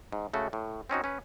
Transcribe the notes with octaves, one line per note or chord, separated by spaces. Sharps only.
G#2
C#3 A3 F#4
A2
C4 C#4 D#4 F#4
C#4 B4